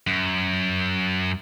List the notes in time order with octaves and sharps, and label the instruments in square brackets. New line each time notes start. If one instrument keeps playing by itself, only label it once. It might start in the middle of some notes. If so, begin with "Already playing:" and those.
[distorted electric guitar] F#2